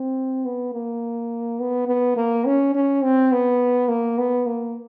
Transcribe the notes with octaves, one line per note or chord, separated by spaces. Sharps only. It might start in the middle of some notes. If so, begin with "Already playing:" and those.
Already playing: C4
B3
A#3
B3
B3
A#3
C#4
C#4
C4
B3
A#3
B3
A#3